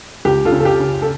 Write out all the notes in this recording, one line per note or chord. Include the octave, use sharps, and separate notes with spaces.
C#2 G4
F4 A4
C#3
A4
G4
C#3
A4